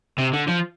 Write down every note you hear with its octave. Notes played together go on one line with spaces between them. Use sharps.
C3
D3
F3